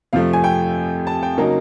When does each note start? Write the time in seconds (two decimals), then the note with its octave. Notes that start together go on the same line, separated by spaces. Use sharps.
0.13 F2 C3 F3 A3 F5
0.33 G#5
0.44 G5
1.07 A5
1.23 G5
1.37 C#3 F#3 A#3 D#4